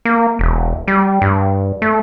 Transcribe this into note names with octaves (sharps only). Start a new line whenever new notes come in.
A#3
E1
G3
G2
A3